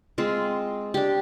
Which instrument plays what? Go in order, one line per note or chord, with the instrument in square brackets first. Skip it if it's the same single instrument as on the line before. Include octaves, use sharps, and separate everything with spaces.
[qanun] G#3 C4 F4
D4 G4